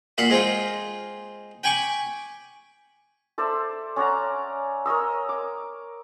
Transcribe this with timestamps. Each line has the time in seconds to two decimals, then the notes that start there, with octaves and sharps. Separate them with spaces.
0.18 A#2 F5 F#5 B5
0.30 G#3 C4 D#4 F4
1.63 G5 G#5 B5 C#6 D6
3.38 A4 C5 D5 E5
3.96 C#4 D5 F#5 A#5
4.86 A#4 C#5 D#5 E6
5.29 D6